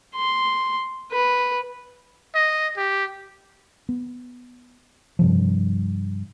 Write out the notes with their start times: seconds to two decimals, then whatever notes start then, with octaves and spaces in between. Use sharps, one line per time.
0.16 C6
1.12 B4
2.35 D#5
2.77 G4
3.89 B3
5.19 G2 C3 F3